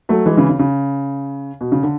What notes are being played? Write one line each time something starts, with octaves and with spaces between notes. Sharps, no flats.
F#3 A3
E3 G#3
C#3 E3
C#3
C#3
B2
C#3
D3